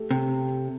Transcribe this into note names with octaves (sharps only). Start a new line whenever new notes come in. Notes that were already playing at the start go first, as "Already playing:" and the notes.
Already playing: A3 G4
C3